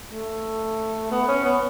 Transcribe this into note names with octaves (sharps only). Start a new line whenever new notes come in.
A3
B3
C#4
B3